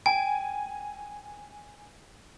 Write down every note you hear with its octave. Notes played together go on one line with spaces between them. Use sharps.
G5 G#5